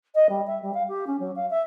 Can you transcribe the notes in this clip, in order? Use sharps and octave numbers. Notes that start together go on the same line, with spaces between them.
D#5
G3
E5
G3
F5
G4
C#4
F#3
F5
E5